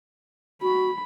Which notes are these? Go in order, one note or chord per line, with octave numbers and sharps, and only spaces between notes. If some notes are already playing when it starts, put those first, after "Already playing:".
F#4 B5